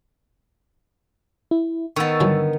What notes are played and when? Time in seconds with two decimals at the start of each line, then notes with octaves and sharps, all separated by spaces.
1.51 E4
1.96 D#3 B3 C#6 E6 A6
2.20 G2 D3 E3 F#3